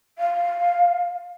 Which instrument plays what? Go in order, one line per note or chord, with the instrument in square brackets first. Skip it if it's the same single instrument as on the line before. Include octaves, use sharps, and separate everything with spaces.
[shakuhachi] F5